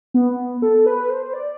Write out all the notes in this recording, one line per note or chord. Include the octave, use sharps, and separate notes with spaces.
B3
A4
B4
C5
D5